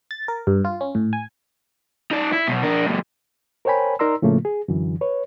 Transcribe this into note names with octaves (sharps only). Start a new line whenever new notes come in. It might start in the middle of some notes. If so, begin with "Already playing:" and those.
A6
A#4
G2
F4
C#4
A2
G#5
D#4 D5
E4
B1 B2
D4 A#4
F#2 A#2
A#4 C5 C#5 G5 G#5 B5
D#4 A#4 D5 A#5 C6 E6
A2 C#3 F3 A3 A#3
G#4
F#2 D3 E3
B4 C#5